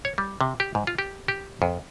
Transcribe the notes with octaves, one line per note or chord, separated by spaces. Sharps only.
C#5
G3
C3
G4
G#2
F4
G4
G4
F2